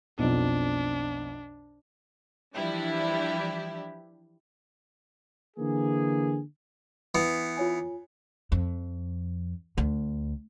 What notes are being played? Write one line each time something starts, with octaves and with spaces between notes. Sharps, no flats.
B1 F2 D4
E3 F3 G3 D4 E4 G4
D3 E3 A#3 G#4
E3 B3
F4 C#5 G#5
F2
D2